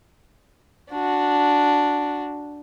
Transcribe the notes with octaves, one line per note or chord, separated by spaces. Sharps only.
D4 F#4